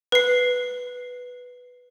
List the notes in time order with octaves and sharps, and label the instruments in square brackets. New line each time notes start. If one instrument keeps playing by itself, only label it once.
[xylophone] B4 C7